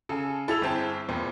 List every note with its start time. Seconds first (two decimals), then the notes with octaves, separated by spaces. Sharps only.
0.09 C#3 A4 G#5
0.48 E4 G#4 A4 E6 F7
0.62 G1 C4 A5
1.09 E2 A#2 C4